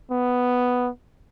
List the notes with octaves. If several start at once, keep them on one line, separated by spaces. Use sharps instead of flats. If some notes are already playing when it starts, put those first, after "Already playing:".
B3